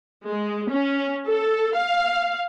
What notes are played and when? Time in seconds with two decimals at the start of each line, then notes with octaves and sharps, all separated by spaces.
0.24 G#3
0.71 C#4
1.26 A4
1.76 F5